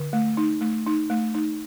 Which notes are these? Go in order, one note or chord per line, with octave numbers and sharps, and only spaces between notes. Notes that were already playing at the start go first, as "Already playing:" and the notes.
Already playing: D3
A3
D#4
A3
D#4
A3
D#4